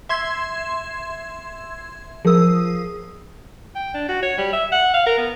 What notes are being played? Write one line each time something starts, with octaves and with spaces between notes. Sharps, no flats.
E5 C6 G#6
F3 G#4 A#4 D#6 E6
G5
D4
F#4
C#5
G3
E5
F#5
F5
A#4
B3